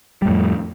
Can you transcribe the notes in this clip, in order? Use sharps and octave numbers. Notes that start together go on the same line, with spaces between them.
F2 A2 G3